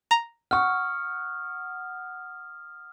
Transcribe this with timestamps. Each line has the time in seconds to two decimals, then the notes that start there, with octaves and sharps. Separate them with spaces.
0.11 A#5
0.51 F#5 C#6 D#6 F6